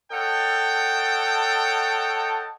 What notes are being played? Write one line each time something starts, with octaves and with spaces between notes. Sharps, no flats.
A4 C#5 D#5 F#5 G5 A5